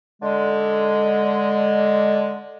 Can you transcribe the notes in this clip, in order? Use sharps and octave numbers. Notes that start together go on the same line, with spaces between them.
D3 G#3